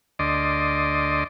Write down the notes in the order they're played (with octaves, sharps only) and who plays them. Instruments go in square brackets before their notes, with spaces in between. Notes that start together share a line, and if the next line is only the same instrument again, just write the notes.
[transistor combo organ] D2 D5 D#5 C6